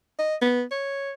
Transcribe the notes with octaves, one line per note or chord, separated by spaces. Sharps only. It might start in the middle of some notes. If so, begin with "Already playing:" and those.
D#5
B3
C#5